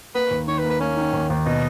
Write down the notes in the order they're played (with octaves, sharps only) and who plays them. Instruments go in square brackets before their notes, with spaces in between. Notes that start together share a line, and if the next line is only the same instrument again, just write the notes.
[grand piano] A#3 [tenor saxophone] B4
[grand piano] D#2
[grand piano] D#3 [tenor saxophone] C#5
[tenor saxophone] B4
[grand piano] A#3
[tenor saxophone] B4
[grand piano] A#3 [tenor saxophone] C#4
[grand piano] D#3
D#2
D#2
[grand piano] B2 [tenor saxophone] D#4